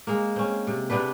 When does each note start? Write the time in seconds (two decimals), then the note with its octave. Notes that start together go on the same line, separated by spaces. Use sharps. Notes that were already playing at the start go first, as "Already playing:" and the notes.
0.07 G#3 A#3
0.36 C4 C#4
0.67 C3
0.90 C3 B3 D4 B4